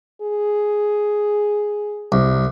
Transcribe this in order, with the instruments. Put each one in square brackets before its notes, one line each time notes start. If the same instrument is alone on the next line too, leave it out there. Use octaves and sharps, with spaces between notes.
[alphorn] G#4
[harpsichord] C2